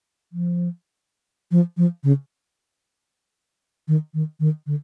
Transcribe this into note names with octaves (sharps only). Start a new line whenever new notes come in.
F3
F3
F3
C#3
D#3
D#3
D#3
D3